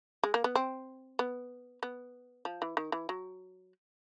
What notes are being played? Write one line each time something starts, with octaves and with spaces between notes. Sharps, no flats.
G#3
A#3
B3
C4
B3
B3
F3
E3
D#3
E3
F#3